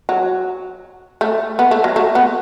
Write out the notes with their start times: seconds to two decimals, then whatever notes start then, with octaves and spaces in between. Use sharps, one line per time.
0.09 F#3
1.21 A3
1.59 B3
1.71 A3
1.84 F#3
1.96 A3
2.15 B3